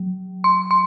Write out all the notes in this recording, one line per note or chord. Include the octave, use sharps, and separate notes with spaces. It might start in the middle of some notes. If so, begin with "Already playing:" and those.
Already playing: F#3
C6
C6